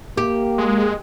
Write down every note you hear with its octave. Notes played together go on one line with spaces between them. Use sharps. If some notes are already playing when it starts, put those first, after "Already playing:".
A#3 G4
G#3